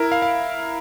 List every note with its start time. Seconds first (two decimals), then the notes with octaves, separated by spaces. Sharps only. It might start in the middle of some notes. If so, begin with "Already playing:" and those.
Already playing: E4 A#4
0.12 F5
0.22 F5